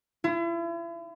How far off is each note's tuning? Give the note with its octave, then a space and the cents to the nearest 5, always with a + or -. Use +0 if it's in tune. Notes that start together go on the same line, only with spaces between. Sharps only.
E4 +40